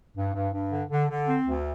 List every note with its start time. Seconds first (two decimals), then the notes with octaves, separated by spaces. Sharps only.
0.16 G2
0.34 G2
0.53 G2
0.72 D3
0.90 D3
1.09 D3
1.28 C4
1.47 D2